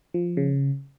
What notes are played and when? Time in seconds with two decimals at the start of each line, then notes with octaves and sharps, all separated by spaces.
0.14 F3
0.37 C#3